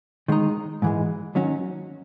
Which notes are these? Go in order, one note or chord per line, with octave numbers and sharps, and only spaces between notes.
D#3 G#3 D#4
G#2 E3 G#3
D#3 F#3 C#4 F#4